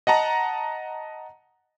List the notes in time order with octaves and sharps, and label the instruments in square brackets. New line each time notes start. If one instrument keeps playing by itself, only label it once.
[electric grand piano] D#5 F#5 A5 A#5